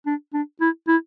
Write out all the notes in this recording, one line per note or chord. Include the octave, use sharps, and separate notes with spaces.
D4
D4
E4
E4